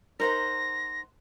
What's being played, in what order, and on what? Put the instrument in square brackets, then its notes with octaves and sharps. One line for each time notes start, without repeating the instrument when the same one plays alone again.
[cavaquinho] D#4 C5 F#5 [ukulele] A#4 [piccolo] A#6